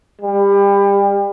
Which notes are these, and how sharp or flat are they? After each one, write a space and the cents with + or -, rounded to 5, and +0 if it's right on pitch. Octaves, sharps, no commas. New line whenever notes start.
G3 +30